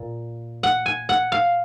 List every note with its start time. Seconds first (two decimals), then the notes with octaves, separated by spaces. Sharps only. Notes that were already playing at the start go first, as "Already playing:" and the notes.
Already playing: A#2
0.63 F#5
0.86 G#5
1.09 F#5
1.32 F5